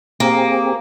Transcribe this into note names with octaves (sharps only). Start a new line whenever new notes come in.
A#3 C4 G4 G#4